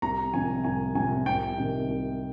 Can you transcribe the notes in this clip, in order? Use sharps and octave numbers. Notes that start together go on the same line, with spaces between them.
C2 A#5
C3 F3 G#5
C2 G#5
C3 F3 G#5
C2 G5
C3 D#3
C2